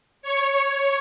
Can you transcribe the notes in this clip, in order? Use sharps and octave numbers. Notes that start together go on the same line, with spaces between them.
C#5 C#6